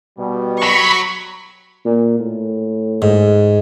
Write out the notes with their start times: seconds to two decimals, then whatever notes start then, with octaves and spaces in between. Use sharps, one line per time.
0.18 B2 G3
0.63 F#3 B5 C#6
1.85 A#2
2.19 A2
3.02 G#2